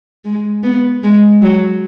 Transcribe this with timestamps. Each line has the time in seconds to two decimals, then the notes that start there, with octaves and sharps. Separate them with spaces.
0.25 G#3
0.63 B3
1.03 G#3
1.42 F#3